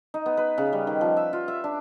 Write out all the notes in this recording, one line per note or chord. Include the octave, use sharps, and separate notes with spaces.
D#4
B3
B4
C#3
G3
D#3
F3
E5
F4
E5
D4